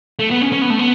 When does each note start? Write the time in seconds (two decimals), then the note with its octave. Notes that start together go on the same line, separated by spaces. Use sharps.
0.19 A3
0.31 B3
0.42 C#4
0.52 C#4
0.62 B3
0.70 A3
0.79 B3